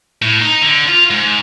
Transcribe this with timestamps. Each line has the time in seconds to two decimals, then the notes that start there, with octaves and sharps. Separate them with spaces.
0.22 A2
0.42 D#4
0.62 D3
0.88 F4
1.11 G#2